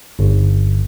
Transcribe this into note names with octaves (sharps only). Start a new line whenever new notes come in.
G1